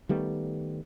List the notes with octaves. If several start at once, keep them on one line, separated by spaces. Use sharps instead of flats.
D#3 G3 A3 B3